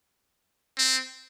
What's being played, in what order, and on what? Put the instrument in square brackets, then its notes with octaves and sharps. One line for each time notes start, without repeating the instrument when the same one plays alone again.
[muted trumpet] C4